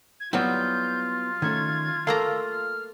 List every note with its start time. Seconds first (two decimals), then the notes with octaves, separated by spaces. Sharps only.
0.20 G#6
0.33 F#3 G3 B3 C4 E4 F4 G6
1.42 D#3 A3 C#4 G#6
2.07 A3 A#3 F5 A#5 E6
2.50 F6